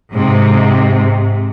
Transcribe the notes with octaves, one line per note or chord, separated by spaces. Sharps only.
G#2 C3